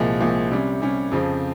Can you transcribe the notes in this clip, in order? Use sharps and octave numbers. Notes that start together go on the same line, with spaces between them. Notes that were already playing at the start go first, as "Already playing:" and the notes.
Already playing: C2 A#2 F3 G#3
C2 A#2 F3 G#3
C3 G3 C#4
C3 G3 C#4
F2 C#3 F3 C4